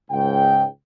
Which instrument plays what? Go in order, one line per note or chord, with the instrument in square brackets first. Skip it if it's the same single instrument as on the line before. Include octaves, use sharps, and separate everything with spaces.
[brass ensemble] C#2 G#2 G5